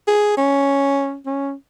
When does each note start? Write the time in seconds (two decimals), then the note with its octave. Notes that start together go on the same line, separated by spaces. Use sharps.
0.08 G#4
0.37 C#4
1.26 C#4